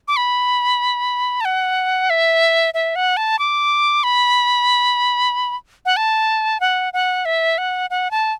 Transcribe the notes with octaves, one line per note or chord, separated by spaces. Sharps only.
D6
B5
A5
F#5
E5
E5
F#5
A5
D6
B5
F#5
A5
F#5
F#5
E5
F#5
F#5
A5